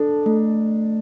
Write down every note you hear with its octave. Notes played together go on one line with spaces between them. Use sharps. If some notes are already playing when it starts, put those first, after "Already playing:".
Already playing: D4 A4
A3